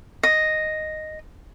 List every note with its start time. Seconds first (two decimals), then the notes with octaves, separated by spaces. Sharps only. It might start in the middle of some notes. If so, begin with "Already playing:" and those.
0.23 D#5